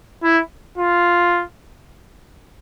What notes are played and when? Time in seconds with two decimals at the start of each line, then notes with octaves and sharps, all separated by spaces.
0.23 E4
0.78 F4